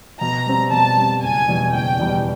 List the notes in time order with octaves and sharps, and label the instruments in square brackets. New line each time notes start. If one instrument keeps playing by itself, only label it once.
[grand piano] B2 [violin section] A#5
[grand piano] G3 C4
[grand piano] B2 [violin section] A5
[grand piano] G3 C4
[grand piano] F#1 [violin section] G#5
[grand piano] E2 B2 G3
[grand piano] F#1 [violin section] G5
[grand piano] E2 B2 G3